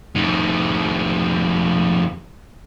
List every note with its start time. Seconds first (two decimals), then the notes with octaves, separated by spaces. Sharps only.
0.16 F2 D#3